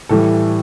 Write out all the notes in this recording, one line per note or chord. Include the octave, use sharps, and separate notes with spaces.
A2 E3 G3 A4